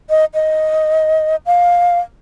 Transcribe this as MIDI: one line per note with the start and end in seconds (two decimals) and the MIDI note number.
0.10 0.25 75
0.34 1.36 75
1.46 1.99 77